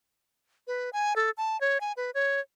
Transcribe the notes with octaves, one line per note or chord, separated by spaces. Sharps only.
B4
G#5
A4
A5
C#5
G#5
B4
C#5